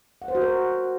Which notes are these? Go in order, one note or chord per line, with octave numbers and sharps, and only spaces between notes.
F#5
C5
F#4
A#4